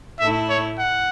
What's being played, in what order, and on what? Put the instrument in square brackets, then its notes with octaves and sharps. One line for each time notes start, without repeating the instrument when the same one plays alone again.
[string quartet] A2 A3 E4 [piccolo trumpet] E5
[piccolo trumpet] C#5
F#5